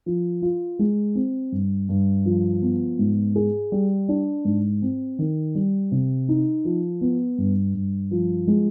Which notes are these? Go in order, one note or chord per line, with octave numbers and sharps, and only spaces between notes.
F3
F4
G#3
C4
G2
G2
F3
B3
G#2
G#4
G3
D4
G#2
C4
D#3
G3
C3
D#4
F3
B3
G2
G2
F3
G#3